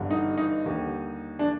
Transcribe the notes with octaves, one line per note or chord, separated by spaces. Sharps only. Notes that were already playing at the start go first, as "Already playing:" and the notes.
Already playing: G1 G2 D3
D#4
D#4
D#2 D3 G3
D4